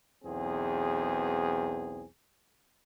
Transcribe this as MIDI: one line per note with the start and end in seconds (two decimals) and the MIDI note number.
0.24 2.05 35
0.24 2.05 40
0.24 2.05 60
0.24 2.05 68